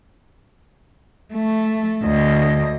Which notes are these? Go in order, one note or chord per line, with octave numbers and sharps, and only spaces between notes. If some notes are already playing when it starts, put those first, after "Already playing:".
A3
D2 D#5